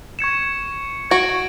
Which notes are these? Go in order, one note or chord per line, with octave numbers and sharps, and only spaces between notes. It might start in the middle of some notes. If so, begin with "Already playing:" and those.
C#6 G#6 C#7 E7
F#4 G#6 D7 F#7